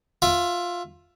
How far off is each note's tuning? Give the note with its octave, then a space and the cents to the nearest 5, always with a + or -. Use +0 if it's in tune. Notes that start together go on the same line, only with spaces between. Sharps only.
F4 +10 E5 +20 D6 +0